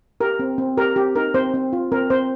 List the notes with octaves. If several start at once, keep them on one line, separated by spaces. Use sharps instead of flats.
G4 A#4
C4
C4
G4 A#4
C4 G4
D#4 A#4
C4 C5
C4
F4
C4 A#4
C4 C5